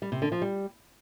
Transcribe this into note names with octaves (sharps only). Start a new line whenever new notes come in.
G3
C3
D3
F3
G3